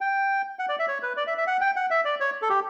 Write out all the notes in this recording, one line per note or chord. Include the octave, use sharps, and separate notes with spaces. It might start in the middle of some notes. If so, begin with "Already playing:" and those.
G5
F#5
D5
E5
C#5
B4
D5
E5
E5
F#5
G5
F#5
E5
D5
C#5
A4
G4